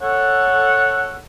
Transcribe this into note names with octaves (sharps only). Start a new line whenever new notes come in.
A4 C#5 F#5